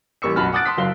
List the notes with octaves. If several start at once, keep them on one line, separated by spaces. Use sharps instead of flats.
A1 G3 A#3 C#6 E6 C#7
B1 F#2 F#4 A5 B5 F6
F#5 D6 D#6 F#6 A6 D7
A5 C6 D#6 B6
F#1 F#3 F5 G7